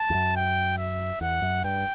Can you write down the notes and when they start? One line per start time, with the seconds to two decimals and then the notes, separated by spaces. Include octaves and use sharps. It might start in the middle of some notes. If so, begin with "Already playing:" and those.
Already playing: A5
0.10 E2
0.14 F#2
0.36 G5
0.78 E5
1.21 E2 F#5
1.42 F#2
1.64 G2 G5